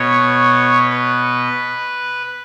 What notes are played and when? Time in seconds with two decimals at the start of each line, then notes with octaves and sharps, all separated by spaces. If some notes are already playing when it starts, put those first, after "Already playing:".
Already playing: B2 C#5
0.90 B4